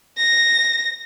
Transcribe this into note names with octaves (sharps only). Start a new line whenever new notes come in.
A#6